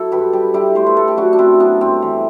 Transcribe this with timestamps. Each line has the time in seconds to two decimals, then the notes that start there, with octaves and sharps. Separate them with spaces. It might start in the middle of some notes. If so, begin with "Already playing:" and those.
Already playing: F#3 E4 A4
0.12 G2 G4 B4
0.33 G3 G4 B4
0.54 G3 E4 G4
0.75 A3 C5
0.86 B4
0.97 A3 A4
1.08 G4
1.17 F#3 D4 F#4
1.33 D4
1.39 F#2 C4 E4
1.60 F#3 B3 D4
1.81 G2 C4
2.02 E3